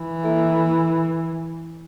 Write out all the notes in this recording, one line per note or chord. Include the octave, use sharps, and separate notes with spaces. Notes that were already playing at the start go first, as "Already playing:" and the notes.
Already playing: E3
A#3 E4 A4 E5